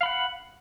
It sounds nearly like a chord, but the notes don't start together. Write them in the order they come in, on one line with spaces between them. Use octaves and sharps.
F5 B5 F#5